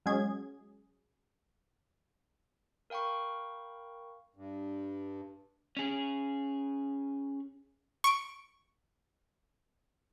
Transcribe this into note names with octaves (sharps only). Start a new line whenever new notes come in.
F#3 G#3 C#4 G#4 G#6
A#4 F5 G5 B5 C#6
G2
C#4 G#4
C#6 C#7 D7